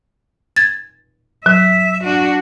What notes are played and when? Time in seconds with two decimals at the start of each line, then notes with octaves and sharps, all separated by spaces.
0.56 G#6 A6
1.46 F#3 E5
2.04 D4 F#4